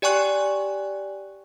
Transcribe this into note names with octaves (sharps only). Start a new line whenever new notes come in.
G4 D5 G5 G#5 C#6 F#6